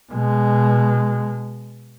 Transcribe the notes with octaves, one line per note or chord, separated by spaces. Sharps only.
B2 G#3